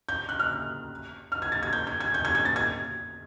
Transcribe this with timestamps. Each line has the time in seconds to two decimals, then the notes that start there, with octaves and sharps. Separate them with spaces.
0.09 G6
0.29 F#6
0.39 F6
1.32 F6
1.42 G#6
1.52 A6
1.63 G#6
1.73 G6
1.87 G#6
2.00 G#6
2.14 G6
2.25 G#6
2.35 G#6
2.45 A6
2.56 G#6